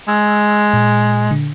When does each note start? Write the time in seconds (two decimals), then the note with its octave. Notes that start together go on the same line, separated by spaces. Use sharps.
0.08 G#3 E6
0.73 A#2
1.31 D3